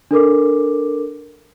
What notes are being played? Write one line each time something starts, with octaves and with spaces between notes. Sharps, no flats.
D4 A4 A#4 D6